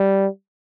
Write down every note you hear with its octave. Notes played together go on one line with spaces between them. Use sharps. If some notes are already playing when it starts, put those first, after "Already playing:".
Already playing: G3